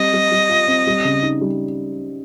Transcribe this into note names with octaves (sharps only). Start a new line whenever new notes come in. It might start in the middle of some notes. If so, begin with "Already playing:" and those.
Already playing: G3 C4 D#5
G3
G3
F4
C4
G3
C#3
D#4
G3